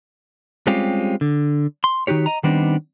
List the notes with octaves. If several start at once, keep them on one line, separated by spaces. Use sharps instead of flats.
G3 G#3 C4 C#4 F4 G4
D3
C6
D#3 D#4 F#4 G4 C#5
D#5 A#5
D#3 G3 B3 C4 D4 D#4